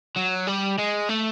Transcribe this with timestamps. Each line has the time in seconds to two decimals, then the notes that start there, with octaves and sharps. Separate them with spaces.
0.16 F#3
0.47 G3
0.78 G#3
1.09 A3